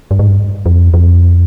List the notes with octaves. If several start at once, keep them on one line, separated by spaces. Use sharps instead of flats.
G2
G#2
G2
F2
F2